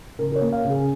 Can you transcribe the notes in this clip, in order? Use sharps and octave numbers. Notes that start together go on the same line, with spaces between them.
C#3 A#4
A#4
C#5
A#3
F5
C#3
G#4